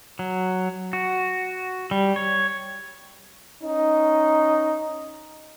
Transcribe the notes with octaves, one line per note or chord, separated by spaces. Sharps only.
F#3
F#4
G3
C#5
C#4 D#4